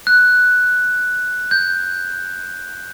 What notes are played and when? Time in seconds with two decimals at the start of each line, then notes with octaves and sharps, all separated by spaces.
0.07 F#6
1.51 G6